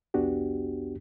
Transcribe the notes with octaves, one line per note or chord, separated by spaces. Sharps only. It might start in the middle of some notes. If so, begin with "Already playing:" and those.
C2 F2 B3 D4 F#4 G4